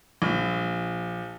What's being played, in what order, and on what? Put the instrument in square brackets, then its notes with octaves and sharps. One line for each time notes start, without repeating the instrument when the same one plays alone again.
[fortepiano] A#1